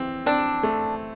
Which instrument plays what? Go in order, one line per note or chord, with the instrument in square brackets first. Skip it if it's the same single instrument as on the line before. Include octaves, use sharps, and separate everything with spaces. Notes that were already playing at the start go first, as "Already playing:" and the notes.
Already playing: [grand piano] E3 C4
[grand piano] C4 [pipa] D4
[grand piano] A3